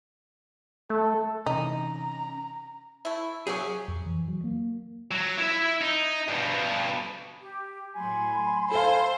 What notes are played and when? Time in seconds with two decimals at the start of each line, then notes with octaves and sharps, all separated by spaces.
0.90 A3 A4
1.46 C3 E3 C#4 D#4 A#5
3.05 A3 E4
3.47 F#3 A#3 C#4 G4 G#4
3.88 F2
4.06 E3
4.28 F#3
4.44 A#3
5.11 F#3
5.38 E4 E5
5.81 D#4
6.28 G2 B2
7.41 G4
7.96 A2 F#3 G#5 B5 C6
8.71 A4 C5 F5 G#5